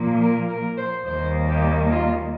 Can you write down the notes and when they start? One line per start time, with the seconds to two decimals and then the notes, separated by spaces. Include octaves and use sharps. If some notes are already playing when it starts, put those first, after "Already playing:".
Already playing: A#2 F3 A#3
0.21 A#4
0.49 A#4
0.78 C5
1.06 D#2 D#3 G3 A#3 C5
1.48 G4
1.91 F4